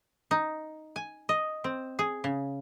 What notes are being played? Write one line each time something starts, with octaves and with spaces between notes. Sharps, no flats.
D#4
G#5
D#5
C4
G#4
C#3